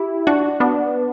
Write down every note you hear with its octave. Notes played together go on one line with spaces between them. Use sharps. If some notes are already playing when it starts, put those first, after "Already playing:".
Already playing: E4 G4
D4 F#4
B3 D4